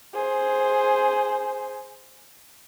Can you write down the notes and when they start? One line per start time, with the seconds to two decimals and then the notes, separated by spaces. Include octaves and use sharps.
0.14 G#4 C5